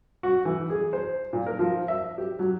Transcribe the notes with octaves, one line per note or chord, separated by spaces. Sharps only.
F#4
E3
G#4
C5
A#2
A#4
F3
E5
G4
F#3